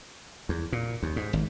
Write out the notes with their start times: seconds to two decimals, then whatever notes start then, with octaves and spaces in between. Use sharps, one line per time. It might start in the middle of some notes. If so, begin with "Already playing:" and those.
0.49 E2
0.72 A#2
1.03 D#2
1.16 G#2
1.33 G#1